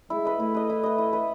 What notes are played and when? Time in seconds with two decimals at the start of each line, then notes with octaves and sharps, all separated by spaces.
0.10 G#3 E4
0.25 B4 D#5
0.40 A3 E4
0.54 B4 D#5
0.70 E4
0.83 B4 D#5
0.98 E4
1.13 B4 D#5